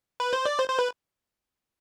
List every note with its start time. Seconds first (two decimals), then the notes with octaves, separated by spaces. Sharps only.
0.20 B4
0.33 C5
0.46 D5
0.59 C5
0.69 C5
0.79 B4